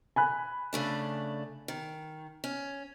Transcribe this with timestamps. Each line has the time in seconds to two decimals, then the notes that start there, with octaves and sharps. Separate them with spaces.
0.16 G#5 B5 F#6
0.73 C#3 A3 D4
1.68 D#3
2.44 C#4